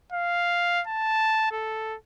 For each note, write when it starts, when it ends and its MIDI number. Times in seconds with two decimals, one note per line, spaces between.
0.12 0.82 77
0.87 1.52 81
1.52 1.96 69